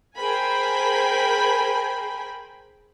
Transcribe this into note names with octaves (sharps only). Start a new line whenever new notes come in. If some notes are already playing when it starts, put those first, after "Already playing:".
G#4 A#4 C5 G5 G#5 B5